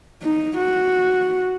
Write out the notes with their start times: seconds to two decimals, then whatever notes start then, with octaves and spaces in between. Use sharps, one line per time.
0.23 D#4
0.58 F#4